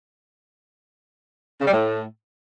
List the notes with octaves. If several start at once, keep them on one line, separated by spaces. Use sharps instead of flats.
C#3
G3
A2